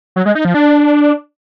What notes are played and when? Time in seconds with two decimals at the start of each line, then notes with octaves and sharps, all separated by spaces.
0.16 F#3
0.26 G#3
0.35 D#4
0.45 F3
0.54 D4